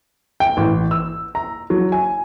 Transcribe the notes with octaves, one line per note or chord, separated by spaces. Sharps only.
G5
A1
E6
A#5
F#3
G#5